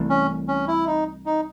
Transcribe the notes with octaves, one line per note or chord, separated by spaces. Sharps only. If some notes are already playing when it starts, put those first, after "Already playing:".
Already playing: C2 C3 E3 A3
C#4
C#4
E4
D#4
D#4